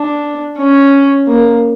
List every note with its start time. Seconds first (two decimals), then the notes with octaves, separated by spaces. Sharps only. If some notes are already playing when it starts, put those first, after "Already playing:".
Already playing: D4
0.58 C#4
1.28 A#3